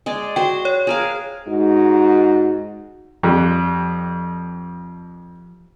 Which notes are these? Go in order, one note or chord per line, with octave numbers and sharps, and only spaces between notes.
G#3 G#4 D5
F#4 C5 G5
C#5
G#4 A#4 F5
G#2 G#3 D#4 F#4
F2 F3 G3